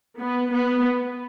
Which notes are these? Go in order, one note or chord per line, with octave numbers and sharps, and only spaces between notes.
B3
B3